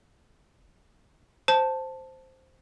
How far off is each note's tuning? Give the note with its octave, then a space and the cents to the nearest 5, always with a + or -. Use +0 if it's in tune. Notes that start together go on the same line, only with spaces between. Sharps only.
C5 +0 A5 +0